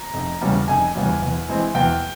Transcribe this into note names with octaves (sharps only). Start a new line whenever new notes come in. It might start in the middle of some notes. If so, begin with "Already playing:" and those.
Already playing: A#5
F1
E2 C#3 G3 C#4
F1 G#5
E2 C#3 G3 C#4
E2
E3 G#3 C4
E2 G5